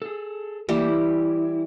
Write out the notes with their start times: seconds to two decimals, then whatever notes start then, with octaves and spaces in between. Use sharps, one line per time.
0.02 G#4 A4
0.69 E3 G3 A3 A#3 G4
0.88 E4